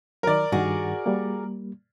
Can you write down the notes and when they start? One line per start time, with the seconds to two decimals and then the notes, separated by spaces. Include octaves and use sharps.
0.23 D#3 F#3 A#4 D5
0.52 G2 D#3 F#4 G#4
1.06 G3 A#3